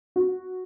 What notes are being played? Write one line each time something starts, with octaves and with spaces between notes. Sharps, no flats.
F#4